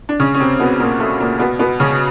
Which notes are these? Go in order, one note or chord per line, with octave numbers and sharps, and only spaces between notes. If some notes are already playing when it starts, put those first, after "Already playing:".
D4
C#3 C#4
C#4
C3 C4
B2 B3
A#2 A#3
A3
A#2 A#3
B2 B3
B2 B3
C#3 C#4